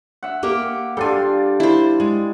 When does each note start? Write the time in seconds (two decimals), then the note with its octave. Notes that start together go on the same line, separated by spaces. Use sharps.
0.23 E5 F#5
0.43 A#3 G4 A#4
0.97 G3 D4 F4 A4 G#5
1.60 E4 C5
2.00 G#3